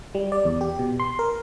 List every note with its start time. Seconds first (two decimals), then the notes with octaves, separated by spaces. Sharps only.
0.15 G3
0.32 D5
0.45 E2
0.61 G4
0.79 B2
1.00 C6
1.19 A#4